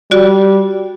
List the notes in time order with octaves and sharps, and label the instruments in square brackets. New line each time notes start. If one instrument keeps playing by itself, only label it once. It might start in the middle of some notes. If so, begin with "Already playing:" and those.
[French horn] G3 [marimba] F#4 D5